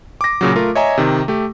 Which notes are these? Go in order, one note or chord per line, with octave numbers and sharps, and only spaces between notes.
D6 A#6
A#2 C#3 F#3
A3 F4 A#4
C#5 D#5 E5 G#5 A#5
C3 D#3
A3 G4